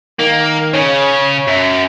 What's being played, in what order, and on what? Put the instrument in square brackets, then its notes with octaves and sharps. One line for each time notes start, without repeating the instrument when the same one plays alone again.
[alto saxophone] D#3 [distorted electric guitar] A#3
[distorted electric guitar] C#3 [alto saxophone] C#5
[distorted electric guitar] F#2